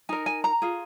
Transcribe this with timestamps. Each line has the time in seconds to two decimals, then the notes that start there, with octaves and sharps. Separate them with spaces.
0.09 D#4 A#4 G#5
0.26 G#5
0.44 A#5
0.62 F4 G#4